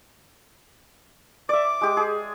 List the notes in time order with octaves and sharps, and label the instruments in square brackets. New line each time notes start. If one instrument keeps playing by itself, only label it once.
[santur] D5 E5 [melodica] D6
[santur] G#3 G4
G#4